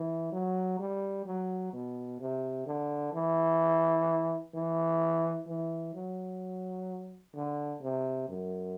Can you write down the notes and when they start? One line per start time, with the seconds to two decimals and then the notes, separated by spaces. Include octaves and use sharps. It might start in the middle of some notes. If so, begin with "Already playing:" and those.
Already playing: E3
0.32 F#3
0.79 G3
1.26 F#3
1.73 B2
2.20 C3
2.66 D3
3.13 E3
4.54 E3
5.48 E3
5.94 F#3
7.34 D3
7.82 C3
8.28 F#2